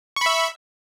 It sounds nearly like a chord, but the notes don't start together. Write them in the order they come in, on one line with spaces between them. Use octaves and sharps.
C#6 B5 E5